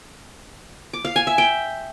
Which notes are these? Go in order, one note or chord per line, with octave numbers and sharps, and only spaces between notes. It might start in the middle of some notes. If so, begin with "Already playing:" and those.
D6
F5
G#5
E5
G5